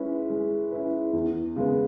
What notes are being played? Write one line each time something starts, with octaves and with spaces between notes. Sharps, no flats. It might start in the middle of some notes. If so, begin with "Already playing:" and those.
Already playing: G#3 C#4 E4 B4
G#3
C#4 E4 B4
E2
C#3 G#3 B3